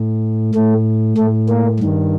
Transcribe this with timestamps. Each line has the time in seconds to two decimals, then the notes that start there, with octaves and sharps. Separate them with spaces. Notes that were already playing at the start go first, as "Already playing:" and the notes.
Already playing: A2
0.55 A2 A3
1.17 A2 A3
1.49 A#3
1.80 G2 D#3